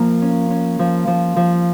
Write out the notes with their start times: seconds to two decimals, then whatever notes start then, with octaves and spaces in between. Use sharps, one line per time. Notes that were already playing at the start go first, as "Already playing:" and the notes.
Already playing: F3 A#3
0.22 C#4
0.51 C#4
0.79 F3
1.07 F3
1.36 F3